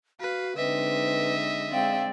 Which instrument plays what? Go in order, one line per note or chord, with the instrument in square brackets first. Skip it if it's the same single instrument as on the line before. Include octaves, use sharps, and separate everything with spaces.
[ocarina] F#4 [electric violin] B4 [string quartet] F5
[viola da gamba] D3 G#3 D#4 [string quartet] C4 [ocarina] B4 [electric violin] D#5 E5
[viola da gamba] G#3 [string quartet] C4 D5 G5 [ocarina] F5